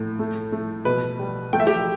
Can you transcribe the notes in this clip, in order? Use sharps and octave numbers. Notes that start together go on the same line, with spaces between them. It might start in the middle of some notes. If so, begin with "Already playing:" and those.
Already playing: A2
A3
A3
B2 B4
G3
A3 G5
E5
G4 G5